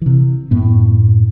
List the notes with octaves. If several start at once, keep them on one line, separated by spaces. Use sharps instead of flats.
C3 E3
F#2 A2 B3